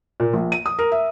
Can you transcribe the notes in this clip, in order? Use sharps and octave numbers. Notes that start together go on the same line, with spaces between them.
A#2
A#1
D#7
D#6
A#4
E5